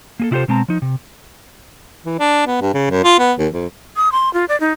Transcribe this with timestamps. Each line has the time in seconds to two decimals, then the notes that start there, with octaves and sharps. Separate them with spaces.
0.20 A#3 G#4 A4
0.31 C3 E4 F4 G4 A4 C5
0.48 B2 G#3 C4 A5 A#5
0.68 F3 D#4
0.82 C3
2.06 E3
2.20 D4
2.47 B3
2.61 G2
2.74 C#3
2.90 F#2
3.04 F4
3.19 B3
3.38 D#2
3.53 F2
3.96 D#6
4.12 C6
4.34 F4
4.49 D5
4.60 D#4